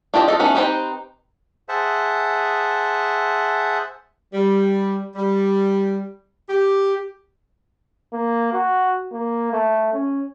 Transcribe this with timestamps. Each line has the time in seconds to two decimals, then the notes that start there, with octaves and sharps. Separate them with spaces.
0.14 D4 F4 G4 D5 D#5
0.28 A3 F4 A4 D#5
0.39 A3 B3 C#4 D#4 B4
0.55 C4 D#4 G4 B4 C5
1.69 G#4 C5 E5 F#5 A5
4.34 G3
5.16 G3
6.48 G4
8.13 A#3
8.53 F#4
9.12 A#3
9.53 A3
9.93 C#4